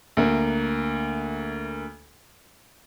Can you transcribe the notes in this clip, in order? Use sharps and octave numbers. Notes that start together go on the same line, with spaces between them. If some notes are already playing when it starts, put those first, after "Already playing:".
D2 A#3